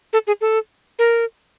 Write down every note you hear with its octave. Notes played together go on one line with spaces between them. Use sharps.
A4
G#4
A4
A#4